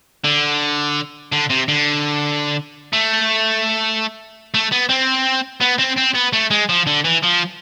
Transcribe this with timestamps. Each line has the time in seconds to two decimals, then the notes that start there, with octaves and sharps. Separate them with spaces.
0.24 D3
1.32 D3
1.50 C3
1.68 D3
2.93 A3
4.54 A3
4.72 B3
4.89 C4
5.61 B3
5.79 C4
5.98 C4
6.15 B3
6.33 A3
6.51 G#3
6.69 F3
6.87 D3
7.05 E3
7.23 F3